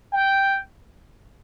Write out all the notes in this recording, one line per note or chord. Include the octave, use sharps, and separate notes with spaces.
G5